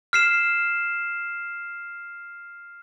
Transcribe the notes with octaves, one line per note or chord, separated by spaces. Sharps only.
F6 C7 E7